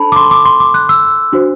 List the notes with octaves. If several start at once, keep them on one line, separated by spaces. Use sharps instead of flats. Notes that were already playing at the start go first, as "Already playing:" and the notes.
Already playing: D4 A4 C5 A5 B5
D6
C6
D6
C6
D6
F#6
E6
D4 F#4 C5